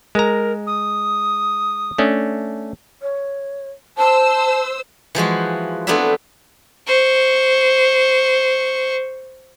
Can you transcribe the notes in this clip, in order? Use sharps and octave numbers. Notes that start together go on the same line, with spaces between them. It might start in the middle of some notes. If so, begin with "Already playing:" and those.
G#3 A#4 A#5
D#6
A3 C#4 D4
C#5
C5 A5 E6
E3 F3 G#3 F#4
A3 B3 C4 D4 E4 E5
C5 C#6